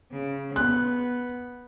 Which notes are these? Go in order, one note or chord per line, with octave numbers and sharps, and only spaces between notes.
C#3
B3 F#6